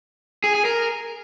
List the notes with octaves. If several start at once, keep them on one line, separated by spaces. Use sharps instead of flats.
G#4
G#4
A#4